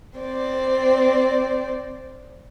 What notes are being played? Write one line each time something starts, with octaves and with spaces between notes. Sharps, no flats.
C4 D5